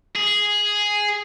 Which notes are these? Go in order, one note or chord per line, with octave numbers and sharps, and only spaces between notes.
G#4